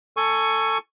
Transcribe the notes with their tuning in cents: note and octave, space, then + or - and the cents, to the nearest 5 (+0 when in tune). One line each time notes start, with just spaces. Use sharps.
A4 +20 G#5 +5 C#6 +0